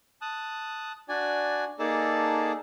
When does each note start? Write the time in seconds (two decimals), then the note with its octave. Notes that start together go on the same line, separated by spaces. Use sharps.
0.21 A5 D#6 F#6
1.09 D4 F#4 D5 G#5
1.79 A#3 D#4 G#4 A4 D5 A5